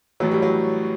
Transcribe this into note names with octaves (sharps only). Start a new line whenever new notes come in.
A1 A2 E3 F#3
G3
F#3